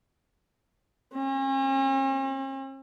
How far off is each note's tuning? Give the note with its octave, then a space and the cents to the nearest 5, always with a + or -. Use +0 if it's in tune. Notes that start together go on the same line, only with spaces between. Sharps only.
C#4 -45